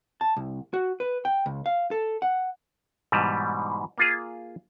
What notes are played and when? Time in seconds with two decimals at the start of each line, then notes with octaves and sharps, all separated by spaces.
0.21 A5
0.37 C2
0.74 F#4
1.00 B4
1.25 G5
1.46 C#2
1.66 F5
1.91 A4
2.22 F#5
3.12 G#2 B2 E3 G3
3.98 A#3 F4 G#4